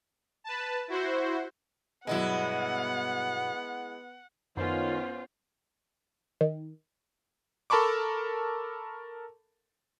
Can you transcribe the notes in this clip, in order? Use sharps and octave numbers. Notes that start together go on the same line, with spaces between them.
B4 A5
E4 F#4 C5
G2 B2 F#3 G#3 B3 E4 F#5
F#2 D#3 B3 C#4 F4 C5
D#3
A4 A#4 A5 B5 C#6 D6